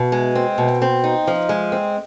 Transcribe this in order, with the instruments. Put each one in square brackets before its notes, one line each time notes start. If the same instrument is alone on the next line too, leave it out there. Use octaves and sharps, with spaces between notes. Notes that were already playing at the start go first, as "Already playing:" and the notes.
Already playing: [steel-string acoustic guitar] B2
G#3
C4
B2
C4
D#4
F3
G#3
C4